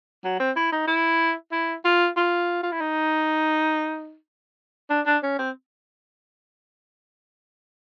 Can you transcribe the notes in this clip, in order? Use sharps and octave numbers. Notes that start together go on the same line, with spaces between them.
F#3
C4
E4
D#4
E4
E4
F4
F4
F4
E4
D#4
D4
D4
C#4
C4